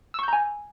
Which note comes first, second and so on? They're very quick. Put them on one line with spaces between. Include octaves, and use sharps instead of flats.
E6 C#6 G6 A#5 G#5